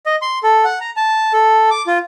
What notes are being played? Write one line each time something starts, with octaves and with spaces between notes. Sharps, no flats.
D#5
C6
A4
F#5
A#5
A5
A4
D6
F4